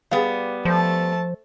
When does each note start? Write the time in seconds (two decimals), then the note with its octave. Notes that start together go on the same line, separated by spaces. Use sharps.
0.11 G3 B3 G#4 B4 F5
0.65 F3 A3 C5 A5